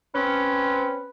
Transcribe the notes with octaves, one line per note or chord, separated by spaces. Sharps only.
C4 C#4 B4